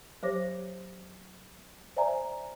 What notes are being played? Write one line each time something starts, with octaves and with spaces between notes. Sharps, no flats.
F#3 G4 C5 C#5 D6 A#6
C5 D5 E5 G#5 A#5